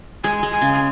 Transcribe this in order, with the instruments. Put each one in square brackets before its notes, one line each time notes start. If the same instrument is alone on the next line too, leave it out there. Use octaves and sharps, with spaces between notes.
[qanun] G#3 [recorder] G#5
[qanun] G#3
[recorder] G#5
[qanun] C#3
[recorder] G#5